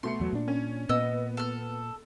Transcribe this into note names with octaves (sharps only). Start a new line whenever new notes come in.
B2 A3 C6 C#7
E2 F#3
A#2 D4
C#4
A#2 B3 D#5 E6
A4 F6